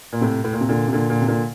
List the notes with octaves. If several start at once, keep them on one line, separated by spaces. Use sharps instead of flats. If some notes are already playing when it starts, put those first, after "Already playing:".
A#2
A2 C3
A2
A#2
C3
A#2 D3
C3
A#2 D3
A#2 D3
C3
A#2 D3